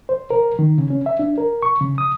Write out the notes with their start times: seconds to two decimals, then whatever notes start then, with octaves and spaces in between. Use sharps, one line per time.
0.09 C5
0.30 A#4
0.59 D#3
0.78 C#3
0.90 C#4
1.06 E5
1.19 D4
1.38 A#4
1.63 C#6
1.81 C#3
1.98 D#6